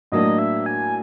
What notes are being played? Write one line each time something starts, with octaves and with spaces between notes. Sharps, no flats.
A2 F#3 A#3 D4 D#5
E5
G#5